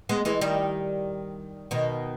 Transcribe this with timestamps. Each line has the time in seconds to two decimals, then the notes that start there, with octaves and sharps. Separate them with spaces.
0.09 G#3 B3
0.25 E3 G#3
0.41 D#3 G3
1.71 B2 D#3